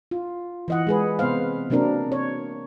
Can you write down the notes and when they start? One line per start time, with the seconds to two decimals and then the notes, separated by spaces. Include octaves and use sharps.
0.11 F4
0.68 E3 D#5 F#5
0.87 G#3 G#4 B4
1.19 C3 B3 B4 C5 F5
1.70 C3 F#3 A#3 C4 D4 A#4
2.12 C#5